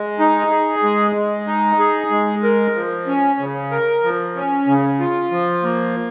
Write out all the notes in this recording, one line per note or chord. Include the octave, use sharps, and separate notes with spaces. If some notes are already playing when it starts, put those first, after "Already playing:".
Already playing: G#3
D#4
G#4
G#3
G#3
D#4
G#4
G#3
A#4
F3
C#4
C#3
A#4
F3
C#4
C#3
F4
F3
A#3